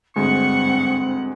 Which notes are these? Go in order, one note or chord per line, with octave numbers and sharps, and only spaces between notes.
D2 G2 G#3 C4 F#5 C#6